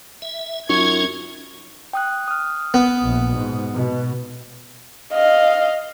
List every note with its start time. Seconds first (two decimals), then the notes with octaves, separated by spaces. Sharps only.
0.22 E5
0.69 F#2 C#4 D#4 F4 C#6 G#6
1.93 G5 D#6 F#6
2.28 D#6 F6
2.74 B3
3.04 A#1
3.33 G#2 B2
3.72 B2
5.12 D#5 F5